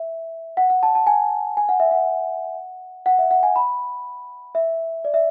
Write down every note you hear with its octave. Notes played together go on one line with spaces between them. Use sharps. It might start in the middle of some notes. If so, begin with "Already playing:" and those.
Already playing: E5
F#5
F#5
A5
A5
G#5
G#5
F#5
E5
F#5
F#5
E5
F#5
G#5
B5
E5
D5
E5